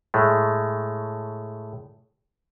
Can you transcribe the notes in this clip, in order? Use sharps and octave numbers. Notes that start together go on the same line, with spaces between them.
A2 G#3 A3